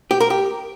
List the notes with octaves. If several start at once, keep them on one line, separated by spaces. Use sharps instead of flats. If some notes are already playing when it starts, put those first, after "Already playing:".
G4
A#4
G4